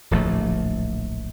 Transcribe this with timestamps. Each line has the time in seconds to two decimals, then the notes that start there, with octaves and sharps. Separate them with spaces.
0.11 D1 A#1 F3 A3